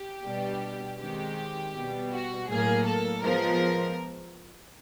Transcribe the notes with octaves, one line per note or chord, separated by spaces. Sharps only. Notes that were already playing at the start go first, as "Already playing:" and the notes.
Already playing: G4
B2 G3 B3 D4
D#3 G#3 C4 G4
B2 G3 B3
F#4
A2 F#3 A#3 G#4
A4
F3 G#3 B3 A#4